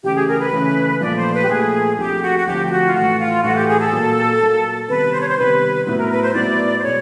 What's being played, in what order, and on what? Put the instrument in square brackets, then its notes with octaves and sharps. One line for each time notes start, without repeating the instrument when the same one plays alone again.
[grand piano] C#3 E3 A3 C#4 [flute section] G4
[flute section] G#4
A#4
B4
[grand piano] C#3 E3 A3 C#4
[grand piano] A#2 F3 A3 [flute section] D5
[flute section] C5
B4
G4
[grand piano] A#2 F3 A3 [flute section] G#4
[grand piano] D2 D3 F3 A3 C4 [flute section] G4
[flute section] F#4
F#4
[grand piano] D2 D3 F3 A3 C4 [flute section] G4
[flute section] G4
F#4
F4
[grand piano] A2 E3 A3 [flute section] F#4
[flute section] F4
[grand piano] A2 E3 A3 [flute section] F#4
[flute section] G4
G#4
A4
[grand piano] A#2 F#3 A#3
A#2 F#3 A#3
[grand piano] C3 D#3 G3 B3 [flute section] B4
[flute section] C5
C#5
C5
[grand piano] C3 D#3 G3 B3 [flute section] B4
[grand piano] A2 F#3 B3 E4 [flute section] B4
[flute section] A#4
B4
C5
[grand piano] A2 F#3 B3 E4 [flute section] D5
[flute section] C5
[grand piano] B2 G#3 [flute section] C#5